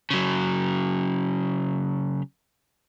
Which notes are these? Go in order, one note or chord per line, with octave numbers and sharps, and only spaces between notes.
C#3 F#3